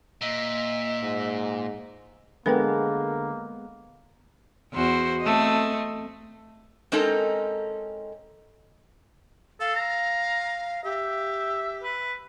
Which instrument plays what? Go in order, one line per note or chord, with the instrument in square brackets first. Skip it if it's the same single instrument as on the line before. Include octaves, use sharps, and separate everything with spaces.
[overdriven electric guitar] A#2 [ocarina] D#5 [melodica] E5
[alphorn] G#2
[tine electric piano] D3 [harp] G#3 B3 [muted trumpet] A#3 [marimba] A#4 B4 G5
[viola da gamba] E2 F#4 C5
A3 C4 D#5
[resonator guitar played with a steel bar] G#3 C4 C#4 D#4 A4 A#4
[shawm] A4 [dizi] F5
[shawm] A#5
[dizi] G4 [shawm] E5
[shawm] B4